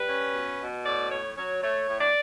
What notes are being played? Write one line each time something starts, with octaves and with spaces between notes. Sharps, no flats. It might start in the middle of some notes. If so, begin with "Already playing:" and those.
Already playing: G3 B4
C#4
B2
B2
A2 D5
A2 C#5
F#3 C#5
A3 C#5
A2
D5